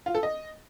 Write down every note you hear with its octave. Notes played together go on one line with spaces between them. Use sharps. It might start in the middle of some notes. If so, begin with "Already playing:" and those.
F4
A4
D#5